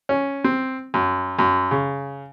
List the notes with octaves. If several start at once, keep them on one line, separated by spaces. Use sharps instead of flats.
C#4
C4
F#2
F#2
C#3